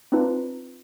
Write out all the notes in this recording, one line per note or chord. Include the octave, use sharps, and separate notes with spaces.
C4 D4 D#4 F4 B4